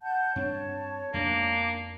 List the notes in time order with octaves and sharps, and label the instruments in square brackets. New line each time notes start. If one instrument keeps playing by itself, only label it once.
[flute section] F#5 A5 G6
[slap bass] G2 C4 D4 [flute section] C#5 A5
[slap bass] F2 G#2 B2 [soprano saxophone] A#3 [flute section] D4